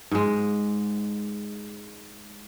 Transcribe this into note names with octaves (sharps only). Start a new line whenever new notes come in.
G#2 G#3